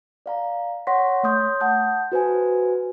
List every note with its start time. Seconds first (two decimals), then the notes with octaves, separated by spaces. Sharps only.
0.26 D5 F5 A#5
0.87 C#5 F#5 C6 C#6 A#6 B6
1.23 A3 C#5 C6 D#6 G6
1.61 F#5 A5 D#6 G6
2.12 F#4 B4 C5 G#5